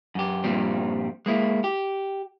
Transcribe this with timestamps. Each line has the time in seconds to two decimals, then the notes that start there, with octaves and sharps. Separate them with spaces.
0.15 F#2 G4
0.44 G2 A#2 F3 G3 C4
1.26 G#3 A#3 E4
1.64 G4